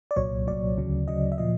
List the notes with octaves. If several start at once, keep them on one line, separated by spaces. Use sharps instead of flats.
D5
C2 A#2 F#3 C#5
C2 A#2 F#3 D5
D2 C#3 F#3
D2 C#3 F#3 D#5
E5
A#2 F3 D#5